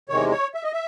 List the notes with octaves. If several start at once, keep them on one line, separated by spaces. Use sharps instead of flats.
E2 C3 D#3 G#3 C#5
C#5
E5
D#5
E5